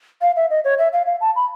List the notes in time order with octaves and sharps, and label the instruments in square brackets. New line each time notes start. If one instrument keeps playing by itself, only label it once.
[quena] F5
E5
D#5
C#5
E5
F5
F5
A5
B5